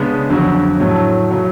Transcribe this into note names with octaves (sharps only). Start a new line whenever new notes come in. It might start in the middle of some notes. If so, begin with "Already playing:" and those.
Already playing: C#3 G#3 B3 D4 G#4
F2 D3 F#3 C#4 F#4
A2 F#3 A3
C#3 F#3